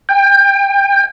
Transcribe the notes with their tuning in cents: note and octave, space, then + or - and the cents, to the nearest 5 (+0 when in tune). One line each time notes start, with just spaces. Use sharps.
G5 +30